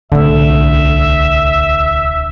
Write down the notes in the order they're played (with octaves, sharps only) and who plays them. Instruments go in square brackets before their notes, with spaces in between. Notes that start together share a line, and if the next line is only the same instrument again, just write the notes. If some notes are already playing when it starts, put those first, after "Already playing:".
[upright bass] D1 C2 [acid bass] D3 [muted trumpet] E5